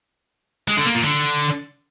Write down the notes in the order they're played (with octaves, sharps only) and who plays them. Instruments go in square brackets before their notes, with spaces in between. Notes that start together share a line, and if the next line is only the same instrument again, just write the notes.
[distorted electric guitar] G#3
D3
A#3
A#2
D3